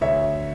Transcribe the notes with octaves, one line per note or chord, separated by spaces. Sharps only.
D2 C#5 E5